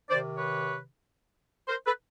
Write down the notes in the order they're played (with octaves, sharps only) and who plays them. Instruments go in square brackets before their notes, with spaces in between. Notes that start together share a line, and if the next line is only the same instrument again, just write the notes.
[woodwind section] D#3 C5 D5
C3
B4 C#5
A#4 C5
A4 B4